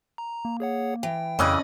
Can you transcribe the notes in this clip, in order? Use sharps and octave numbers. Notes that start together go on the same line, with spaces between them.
A#5
A#3
G#4 C#5 F#5
E3 G5
F2 C#3 E3 C#4 D5 D#5